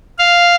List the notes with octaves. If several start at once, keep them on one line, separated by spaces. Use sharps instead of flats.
F5